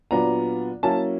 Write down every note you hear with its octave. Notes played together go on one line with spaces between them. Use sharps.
A#2 F#3 B3 D4 F4 A#5
F#3 A#3 C#4 E4 A5